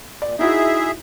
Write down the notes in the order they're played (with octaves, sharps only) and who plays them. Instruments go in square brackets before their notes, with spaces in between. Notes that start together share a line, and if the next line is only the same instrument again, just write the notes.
[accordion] A#2 [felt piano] D5
[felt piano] D#4 E4 F#4 [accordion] G#4 E5